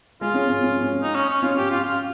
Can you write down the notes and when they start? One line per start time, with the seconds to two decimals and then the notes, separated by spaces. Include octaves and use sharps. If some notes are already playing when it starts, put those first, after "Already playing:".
0.21 G#3 F4
0.34 C#4
0.48 C#4
0.62 C#4
0.82 C#4
1.03 D#4
1.15 C#4
1.29 C#4
1.43 C#4 F4
1.57 G4
1.70 F4
1.84 F4